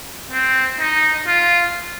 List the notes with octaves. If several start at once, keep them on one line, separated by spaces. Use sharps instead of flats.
C4
D#4
F4